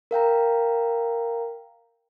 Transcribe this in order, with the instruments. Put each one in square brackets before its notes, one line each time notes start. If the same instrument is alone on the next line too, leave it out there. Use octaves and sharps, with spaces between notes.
[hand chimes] A#4 F5 G5 A#5